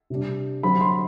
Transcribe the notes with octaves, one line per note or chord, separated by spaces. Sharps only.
C3 G3 D4
D3 F#3 C4 B5
C6